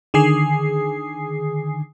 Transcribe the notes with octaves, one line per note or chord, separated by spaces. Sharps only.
D3 D#3 G#4 G#5 D#6 C7